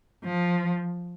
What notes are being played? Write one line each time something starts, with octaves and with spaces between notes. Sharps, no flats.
F3